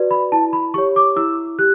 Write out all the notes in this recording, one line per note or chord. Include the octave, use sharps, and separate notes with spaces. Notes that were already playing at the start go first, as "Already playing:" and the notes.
Already playing: F#4 B4 D5
B5
E4 A5
B5
G4 C#5 C#6
D6
E4 E6
G4 F#6